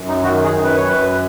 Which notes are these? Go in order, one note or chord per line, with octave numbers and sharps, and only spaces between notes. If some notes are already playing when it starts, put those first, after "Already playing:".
Already playing: F#2
D#4
D#3 F#4
G#4
F#2
B4
C#5
F#2 B4